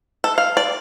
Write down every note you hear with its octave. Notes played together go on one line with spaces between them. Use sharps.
A4
F5
D5